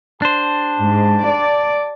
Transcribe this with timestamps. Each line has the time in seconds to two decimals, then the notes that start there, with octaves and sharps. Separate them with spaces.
0.22 D4 G4 C5 A5
0.78 G#2
1.25 D5